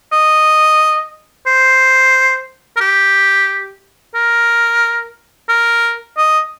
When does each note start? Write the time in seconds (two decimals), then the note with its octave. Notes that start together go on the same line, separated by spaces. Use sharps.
0.12 D#5
1.47 C5
2.77 A#4
2.81 G4
4.15 A#4
5.49 A#4
6.17 D#5